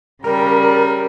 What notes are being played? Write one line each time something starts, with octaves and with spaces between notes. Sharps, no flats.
C#3 G3 A#4